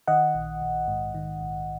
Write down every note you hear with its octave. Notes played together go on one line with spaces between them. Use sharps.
D#3 D#5 F#5
A#1
A#1
G#2
D#3
A#1